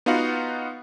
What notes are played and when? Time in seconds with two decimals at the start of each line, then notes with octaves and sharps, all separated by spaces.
0.06 B3 D#4 F4 F#4 F5 F#5